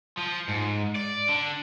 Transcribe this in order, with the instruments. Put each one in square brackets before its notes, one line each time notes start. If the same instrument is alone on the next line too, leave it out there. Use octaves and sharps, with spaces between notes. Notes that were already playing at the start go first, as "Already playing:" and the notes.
[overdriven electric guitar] F3
G#2
D5
D3